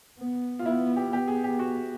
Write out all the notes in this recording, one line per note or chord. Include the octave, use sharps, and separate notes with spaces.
B3
F4
B3 E4
G4
B3 G4
G#4
G4
F#4